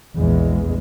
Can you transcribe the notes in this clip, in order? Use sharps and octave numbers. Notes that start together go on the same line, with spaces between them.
A#1 E2 G#3